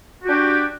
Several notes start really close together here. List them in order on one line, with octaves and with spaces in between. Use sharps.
F#4 G4 D4